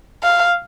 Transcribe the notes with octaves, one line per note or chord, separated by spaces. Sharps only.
F5